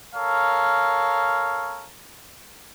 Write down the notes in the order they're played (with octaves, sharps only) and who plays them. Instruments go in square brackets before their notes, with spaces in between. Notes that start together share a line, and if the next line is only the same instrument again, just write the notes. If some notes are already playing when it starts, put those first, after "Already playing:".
[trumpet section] A4 A#4 C#5 F5